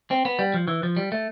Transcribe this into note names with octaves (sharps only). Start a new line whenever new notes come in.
C4
B3
G3
F3
E3
F3
G3
A3